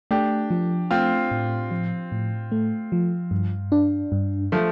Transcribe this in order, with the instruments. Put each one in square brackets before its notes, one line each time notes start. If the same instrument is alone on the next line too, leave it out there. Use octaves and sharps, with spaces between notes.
[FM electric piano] A3 [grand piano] D4 G4
[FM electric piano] F3
[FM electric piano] A3 [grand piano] C4 F4
[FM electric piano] A2
F3
A2
A3
F3
G2
D4
G2
[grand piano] F3 A3